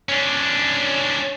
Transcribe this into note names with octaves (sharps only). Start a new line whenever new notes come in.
C#4 D4